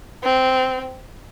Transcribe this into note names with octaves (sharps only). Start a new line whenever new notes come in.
C4